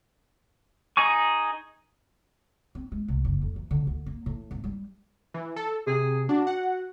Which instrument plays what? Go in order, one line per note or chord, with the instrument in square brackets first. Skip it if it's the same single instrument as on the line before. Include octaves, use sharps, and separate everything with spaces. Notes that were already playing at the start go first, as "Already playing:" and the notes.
[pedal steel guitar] D#4 G#4 G#5 C#6
[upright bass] C4
G#3
C2
F#1
F2
E3
D3
D2
A#3
A2
G#1
G3
[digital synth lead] E3
A4
[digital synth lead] C3 [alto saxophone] G#4
[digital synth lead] D4 [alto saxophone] F#4
[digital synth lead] F#5